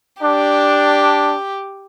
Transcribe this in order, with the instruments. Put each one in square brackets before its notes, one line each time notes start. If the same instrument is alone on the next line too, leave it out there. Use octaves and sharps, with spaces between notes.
[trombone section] D4 [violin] G4